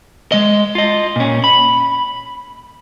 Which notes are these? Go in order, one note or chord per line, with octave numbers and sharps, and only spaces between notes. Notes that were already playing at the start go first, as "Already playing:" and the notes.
G#3 D#5
F4 D#5
A#2 C#4
B5